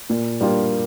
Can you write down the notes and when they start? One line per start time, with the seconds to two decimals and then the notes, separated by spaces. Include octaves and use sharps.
0.10 A#2
0.41 G3 A#3 D4 F4